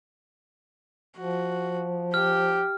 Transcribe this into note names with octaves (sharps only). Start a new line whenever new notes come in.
F3 F#4
G4 F6